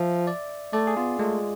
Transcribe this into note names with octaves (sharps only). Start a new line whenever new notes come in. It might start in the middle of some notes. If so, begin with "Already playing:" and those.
Already playing: F3 E5
D5
A3 D5
G#4
B3 F4
G#3 A3